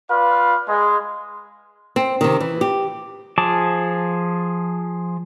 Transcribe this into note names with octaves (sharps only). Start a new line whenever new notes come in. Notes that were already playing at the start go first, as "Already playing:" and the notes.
F4 B4 D5 F5
G#3
C4
C3 D#3
E3
G4
F3 G#4 A5 D6